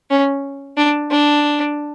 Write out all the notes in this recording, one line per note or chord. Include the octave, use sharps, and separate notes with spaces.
C#4
D4
D4